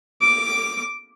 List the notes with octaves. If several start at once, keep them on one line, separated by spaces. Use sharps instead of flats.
D6